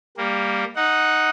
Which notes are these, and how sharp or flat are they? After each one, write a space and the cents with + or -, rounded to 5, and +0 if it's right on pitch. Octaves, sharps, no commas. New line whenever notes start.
G3 +15 A#3 +0
D#4 +0 F#5 +0